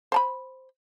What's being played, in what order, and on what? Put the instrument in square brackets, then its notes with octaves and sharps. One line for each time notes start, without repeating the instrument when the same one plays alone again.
[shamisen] C5 A5 B5